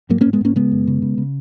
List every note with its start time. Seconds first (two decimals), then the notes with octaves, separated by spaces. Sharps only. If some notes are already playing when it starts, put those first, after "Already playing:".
0.10 G#2 F#3 A#3
0.21 A#3 C#4
0.26 G#2
0.33 G#3 B3
0.41 G#2 A#3 C#4
0.56 C#3 G#3 B3
0.72 F#2
0.87 C#3
1.02 C#3
1.18 C#3